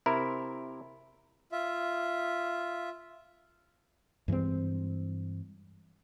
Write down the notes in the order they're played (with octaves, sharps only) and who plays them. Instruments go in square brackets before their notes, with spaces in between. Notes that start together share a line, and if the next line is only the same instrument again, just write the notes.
[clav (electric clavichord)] C3 E4 A#4
[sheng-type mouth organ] F4 E5
[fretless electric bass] G2 E3 G#3 C4